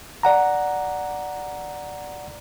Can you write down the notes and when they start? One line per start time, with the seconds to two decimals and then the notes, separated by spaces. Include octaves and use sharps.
0.23 D5 F#5 A#5